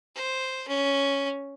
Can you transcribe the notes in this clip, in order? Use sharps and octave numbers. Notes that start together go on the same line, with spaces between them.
C5
C#4